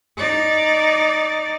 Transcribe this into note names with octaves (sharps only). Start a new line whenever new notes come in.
D#4 D5